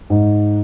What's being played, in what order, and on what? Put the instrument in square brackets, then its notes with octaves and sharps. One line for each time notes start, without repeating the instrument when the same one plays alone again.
[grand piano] G#2